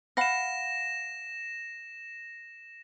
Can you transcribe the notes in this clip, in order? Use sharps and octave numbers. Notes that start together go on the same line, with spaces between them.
F5 F#5 B5 A#6 E7